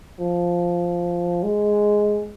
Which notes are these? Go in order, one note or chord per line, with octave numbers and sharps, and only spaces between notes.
F3
G#3